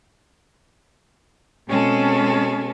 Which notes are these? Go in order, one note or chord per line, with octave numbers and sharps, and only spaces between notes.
B2 G#3 C4 C#4 G#4 A4